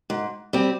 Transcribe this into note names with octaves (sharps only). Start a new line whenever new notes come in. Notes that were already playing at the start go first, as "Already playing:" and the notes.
G#2
G3 C4